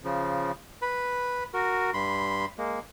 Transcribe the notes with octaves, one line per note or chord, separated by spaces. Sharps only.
C#3 F3
B4 B5
F#4 A#4
G2 B5 C6
G#3 A#3